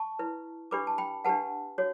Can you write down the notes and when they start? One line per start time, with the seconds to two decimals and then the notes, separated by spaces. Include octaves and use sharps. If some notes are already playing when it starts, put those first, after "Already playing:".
Already playing: A5 C#6
0.19 E4 B4
0.71 D4 G4 B4 B5 D6
0.87 A5
0.98 G5 B5
1.25 D4 G4 B4 F#5 A5
1.78 F#4 C#5